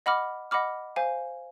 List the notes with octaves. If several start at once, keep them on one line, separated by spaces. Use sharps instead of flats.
D#5 F#5 B5 D6 F6
D#5 F#5 B5 D6 F6
C5 F5 G#5